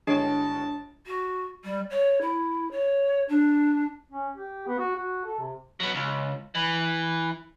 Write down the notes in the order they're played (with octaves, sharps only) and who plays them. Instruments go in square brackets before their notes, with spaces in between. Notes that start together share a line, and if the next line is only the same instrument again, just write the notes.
[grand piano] G1 C#5 D7 [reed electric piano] G#3 E4 F#4 [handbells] D4 [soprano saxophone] A5
[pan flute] F#4
G3
C#5
E4
C#5
D4
[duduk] C#4
G4
B3
F#4
F#4
A4
C3
[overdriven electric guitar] F#3 B3
C#2
E3